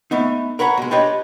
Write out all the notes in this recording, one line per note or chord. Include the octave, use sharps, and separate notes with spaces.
A3 B3 D#4
A#4 B4 C#5 F#5 A#5
B2 G#3
D4 F4 G4 B4 C#5 D#5